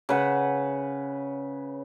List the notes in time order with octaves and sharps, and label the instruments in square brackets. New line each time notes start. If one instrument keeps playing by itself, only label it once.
[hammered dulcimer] C#3 B4 F#5